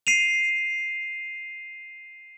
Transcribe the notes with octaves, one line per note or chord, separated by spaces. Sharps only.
C7 D#7 F7